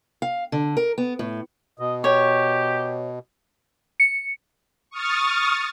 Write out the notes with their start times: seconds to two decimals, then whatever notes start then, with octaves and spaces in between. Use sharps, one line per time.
0.22 F5
0.52 D3
0.77 A#4
0.98 B3
1.19 A2
1.79 B2 D#5
2.04 G4 C#5
4.00 C#7
4.90 C#6 D#6 F6 A6